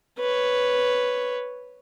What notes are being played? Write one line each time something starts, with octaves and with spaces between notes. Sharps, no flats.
B4 C#5